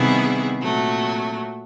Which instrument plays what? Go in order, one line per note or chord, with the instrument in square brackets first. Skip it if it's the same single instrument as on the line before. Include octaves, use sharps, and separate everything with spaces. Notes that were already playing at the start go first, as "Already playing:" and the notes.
Already playing: [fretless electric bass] C3 [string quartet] D#3 G3 B3 E4 G#4
[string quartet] A#2 F#3 A3